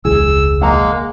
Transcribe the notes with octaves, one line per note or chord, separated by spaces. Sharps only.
E1 C#2 G#4 E6
G#3 A#3 F#5 A#5